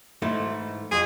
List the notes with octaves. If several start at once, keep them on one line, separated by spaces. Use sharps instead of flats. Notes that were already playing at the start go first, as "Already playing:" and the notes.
G#2 E3 A3
F2 G#4